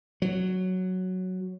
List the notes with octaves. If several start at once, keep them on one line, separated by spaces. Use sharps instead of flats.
F#3